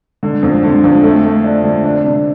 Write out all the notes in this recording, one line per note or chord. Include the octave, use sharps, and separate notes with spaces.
D3
F2
D3
F2
A3
A3
D4
D3
D4
C3